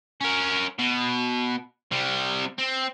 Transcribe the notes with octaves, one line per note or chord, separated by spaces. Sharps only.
C#4 A#4
B2
C3 G3
C4